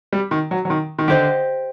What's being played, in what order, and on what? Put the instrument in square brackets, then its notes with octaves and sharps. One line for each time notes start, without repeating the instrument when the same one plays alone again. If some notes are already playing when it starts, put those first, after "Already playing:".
[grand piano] G3
D#3
F#3
F#3
D#3
D#3
[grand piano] D3 [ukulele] G4 C5 D#5